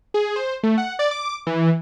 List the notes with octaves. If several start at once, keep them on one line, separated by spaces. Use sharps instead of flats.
G#4
C5
A3
F#5
D5
D6
E3